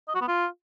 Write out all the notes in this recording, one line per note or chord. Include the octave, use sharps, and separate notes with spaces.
D#5
F#4
B3
F4